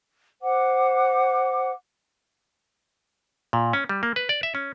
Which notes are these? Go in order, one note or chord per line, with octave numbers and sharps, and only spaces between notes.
C5 F#5 D6
A#2
C#4
G3
A#3
B4
D5
E5
C#4